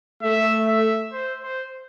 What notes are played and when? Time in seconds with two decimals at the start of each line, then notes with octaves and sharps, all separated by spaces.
0.22 A3 E5
0.67 E5
1.12 C5
1.42 C5